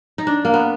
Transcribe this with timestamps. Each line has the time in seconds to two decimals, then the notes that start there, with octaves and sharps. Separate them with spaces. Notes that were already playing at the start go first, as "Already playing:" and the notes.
0.18 D#4
0.27 D4
0.45 A#3
0.54 B3